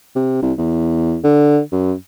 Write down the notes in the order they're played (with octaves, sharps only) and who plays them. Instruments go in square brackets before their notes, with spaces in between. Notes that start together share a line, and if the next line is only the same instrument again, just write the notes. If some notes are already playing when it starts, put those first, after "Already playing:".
[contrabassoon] C3
C2
E2
D3
F#2